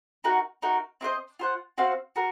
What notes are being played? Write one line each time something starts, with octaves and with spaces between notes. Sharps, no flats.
D#4 F#4 A#4
D#4 F#4 A#4
C4 F4 C5 D#5
F4 C5 F#5
C4 F#4 C5 F5
F#4 A#4